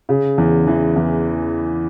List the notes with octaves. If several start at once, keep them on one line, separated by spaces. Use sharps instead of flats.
C#3
E2
E3
E2